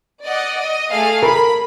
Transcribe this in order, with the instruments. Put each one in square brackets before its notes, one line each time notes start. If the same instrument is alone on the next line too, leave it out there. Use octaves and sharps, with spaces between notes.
[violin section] D5 D#5 F#5
D#5
A3 G#4 F5
[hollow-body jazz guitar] A#4 [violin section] B5